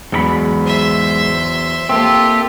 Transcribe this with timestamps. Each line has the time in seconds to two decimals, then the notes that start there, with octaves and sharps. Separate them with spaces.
0.12 E2 G#2 F#3 A4 B5
0.63 C5 E5
1.89 A#3 C4 F4 G4 A4 E5